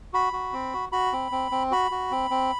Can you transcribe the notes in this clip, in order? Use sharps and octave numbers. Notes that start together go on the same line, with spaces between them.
F#4 B5
F#4
C4
F#4
F#4 B5
C4
C4
C4
F#4 B5
F#4
C4
C4